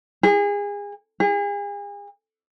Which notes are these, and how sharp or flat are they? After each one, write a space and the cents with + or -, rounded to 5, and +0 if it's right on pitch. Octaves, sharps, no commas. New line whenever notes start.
G#4 -30
G#4 -40